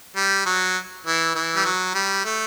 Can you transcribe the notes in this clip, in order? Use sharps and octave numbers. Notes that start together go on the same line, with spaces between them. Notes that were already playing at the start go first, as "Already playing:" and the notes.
G3
F#3
E3
E3
G3
F#3
G3
A3